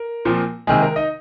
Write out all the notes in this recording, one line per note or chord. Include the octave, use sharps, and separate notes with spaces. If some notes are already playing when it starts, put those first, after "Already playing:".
Already playing: A#4
A#2 F3 C4
C3 D#3 G#3 G#4
A#4
D#4 D#5